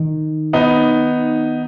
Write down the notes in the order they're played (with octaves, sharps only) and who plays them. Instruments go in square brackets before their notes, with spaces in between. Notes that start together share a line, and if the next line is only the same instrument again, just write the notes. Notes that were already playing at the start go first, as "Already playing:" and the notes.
Already playing: [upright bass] D#3
[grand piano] B3 D#4